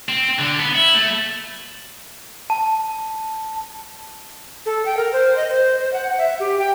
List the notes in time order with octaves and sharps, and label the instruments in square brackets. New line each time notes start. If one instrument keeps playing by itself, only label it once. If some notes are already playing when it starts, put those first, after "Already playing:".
[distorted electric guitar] C4
D3
B3
E4
A3
[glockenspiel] A5
[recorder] A4
G5
A#4
C5
D#5
C5
C5
F#5
E5
G4
G5